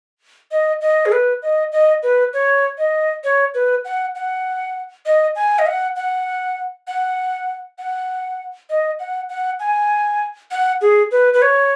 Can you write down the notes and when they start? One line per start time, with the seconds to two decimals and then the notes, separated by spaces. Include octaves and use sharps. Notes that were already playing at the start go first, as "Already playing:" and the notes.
0.51 D#5
0.81 D#5
1.06 G#4
1.12 B4
1.42 D#5
1.72 D#5
2.03 B4
2.33 C#5
2.78 D#5
3.24 C#5
3.54 B4
3.85 F#5
4.15 F#5
5.06 D#5
5.36 G#5
5.59 D#5
5.67 F#5
5.96 F#5
6.87 F#5
7.78 F#5
8.70 D#5
8.99 F#5
9.29 F#5
9.60 G#5
10.51 F#5
10.81 G#4
11.11 B4
11.34 B4
11.42 C#5